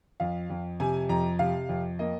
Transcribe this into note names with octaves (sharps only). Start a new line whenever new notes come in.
F2 F5
F2
C3 G#5
F2 A#5
C3 F5
F2
A#3 D#5